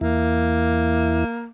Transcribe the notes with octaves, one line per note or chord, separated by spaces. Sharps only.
E2 A#3 E4